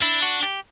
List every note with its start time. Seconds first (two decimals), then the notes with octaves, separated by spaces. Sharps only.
0.01 D4 E4
0.22 F#4
0.43 G4